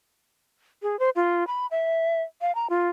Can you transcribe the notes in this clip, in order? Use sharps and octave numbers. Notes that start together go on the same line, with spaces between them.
G#4
C5
F4
B5
E5
F5
A#5
F4